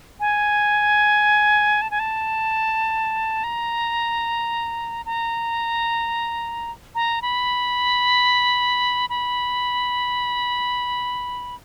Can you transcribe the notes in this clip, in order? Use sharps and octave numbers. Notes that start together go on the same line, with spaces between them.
G#5
A5
G#5
A5
A#5
A#5
A#5
B5
B5